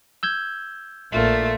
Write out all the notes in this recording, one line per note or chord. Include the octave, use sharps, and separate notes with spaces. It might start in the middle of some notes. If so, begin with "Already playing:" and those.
E6 G6 G#6
A#1 A3 A#3 D4 F4